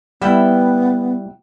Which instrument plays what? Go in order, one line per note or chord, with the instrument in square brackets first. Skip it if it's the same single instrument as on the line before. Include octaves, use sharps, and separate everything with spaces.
[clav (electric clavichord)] G3 E4 [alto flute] B3 [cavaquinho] E5 F#5 G5